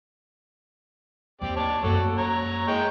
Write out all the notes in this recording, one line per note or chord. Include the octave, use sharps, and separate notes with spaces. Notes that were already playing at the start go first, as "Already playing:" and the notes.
D#2 C4 G4 D5
C#5 D5 A5
F#2 A#3 F#4 A4
C#5 A#5
G#3 G5 C#6